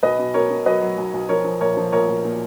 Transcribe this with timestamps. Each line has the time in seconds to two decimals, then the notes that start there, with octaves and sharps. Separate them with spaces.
0.03 B1 B4 D#5
0.19 B2
0.34 B2 A#4 C#5
0.50 B2
0.66 F#3 B4 D#5
0.81 F#3
0.97 B1
1.13 B1
1.29 F3 A#4 C#5
1.44 F3
1.61 A#1 A#4 C#5
1.77 F3
1.92 A#1 A#4 C#5
2.08 A#1
2.24 A#2